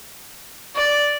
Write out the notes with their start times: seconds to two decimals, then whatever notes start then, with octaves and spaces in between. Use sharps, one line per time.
0.75 D5